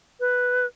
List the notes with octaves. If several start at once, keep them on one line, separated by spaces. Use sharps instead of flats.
B4